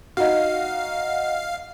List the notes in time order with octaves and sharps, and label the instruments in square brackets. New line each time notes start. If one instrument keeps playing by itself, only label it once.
[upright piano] D#4 F#4 [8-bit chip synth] F5